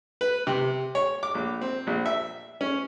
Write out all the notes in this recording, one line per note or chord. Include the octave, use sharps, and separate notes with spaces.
B4
C3
C#5
D6
A#1
C4
A#1
E5
C#4